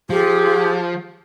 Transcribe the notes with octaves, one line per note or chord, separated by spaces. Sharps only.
F3 G4 G#4